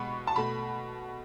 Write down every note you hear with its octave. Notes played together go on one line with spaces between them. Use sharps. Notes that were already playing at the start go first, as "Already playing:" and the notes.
Already playing: B2 G#3 B3 B5 C#6
A5
B2 A3 B5